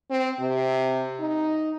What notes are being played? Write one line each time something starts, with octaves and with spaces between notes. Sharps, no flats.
C4
C3
D#4